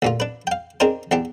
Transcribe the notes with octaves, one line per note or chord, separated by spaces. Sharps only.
D2 A#2 F4
D4 B4
F5 G5
C4 D4 D#4 G#4 A#4 C5
E2 D4 G4